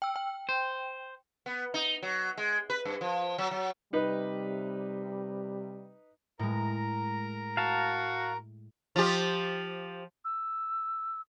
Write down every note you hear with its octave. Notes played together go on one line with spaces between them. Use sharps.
G5 E6
G5
C5
B3
D#4
F#3
G#3
B4
G2
F3
F#3
F#3
C3 G3 D#4 B4
A2 G#3 A#4 A#5
F#4 F5 A5
F3 F4 G4
E6